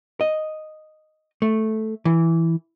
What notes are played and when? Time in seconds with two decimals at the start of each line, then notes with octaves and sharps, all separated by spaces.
0.21 D#5
1.42 A3
2.05 E3